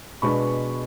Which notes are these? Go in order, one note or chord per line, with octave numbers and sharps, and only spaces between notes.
B2 G#3 B3 D4 B5 C#6